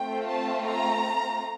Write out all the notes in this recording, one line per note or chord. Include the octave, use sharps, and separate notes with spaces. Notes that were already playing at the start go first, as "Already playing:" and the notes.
Already playing: A3 C4 F4 A4 G5
A5
A#5